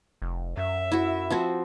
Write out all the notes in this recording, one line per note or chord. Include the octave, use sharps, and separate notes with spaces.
F1
F#2 E5
E4 F#4
F3 C4 F#4